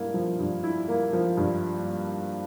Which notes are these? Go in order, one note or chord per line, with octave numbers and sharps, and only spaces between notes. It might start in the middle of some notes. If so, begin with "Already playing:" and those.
Already playing: G2 A#3 E4
F3
G2
E4
A#3
F3
G2